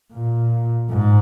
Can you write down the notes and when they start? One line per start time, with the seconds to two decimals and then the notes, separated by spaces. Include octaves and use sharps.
0.13 A#2
0.91 G#2